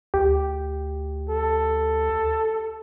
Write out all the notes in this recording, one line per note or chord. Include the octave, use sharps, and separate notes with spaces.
D2 G4
A4